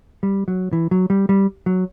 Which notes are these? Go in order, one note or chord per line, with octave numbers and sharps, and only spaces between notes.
G3
F#3
E3
F#3
G3
G3
F#3